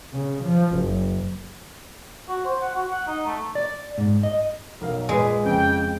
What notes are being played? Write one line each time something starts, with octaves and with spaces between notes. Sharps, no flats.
C#3
F3
F#1
F#4
C5
F#5
F#4
F#5
D#4
A3
D5
G#2
D#5
B1 A#4 F5
A#2 G#3 B4 G#5
F2 C#3 G5